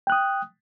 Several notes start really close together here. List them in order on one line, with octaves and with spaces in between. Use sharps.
G5 F#6 D#6